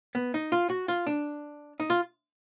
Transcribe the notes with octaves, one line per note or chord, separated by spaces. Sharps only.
B3
D#4
F4
F#4
F4
D4
D#4
F4